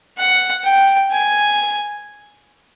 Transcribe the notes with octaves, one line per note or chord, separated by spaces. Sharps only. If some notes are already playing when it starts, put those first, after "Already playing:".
F#5
G5
G#5